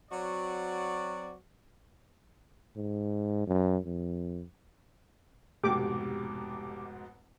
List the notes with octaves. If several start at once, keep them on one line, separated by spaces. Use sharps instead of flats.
F#3 C4 F#4 D5
G#2
F#2
F2
F1 G#2 B2 G4 D6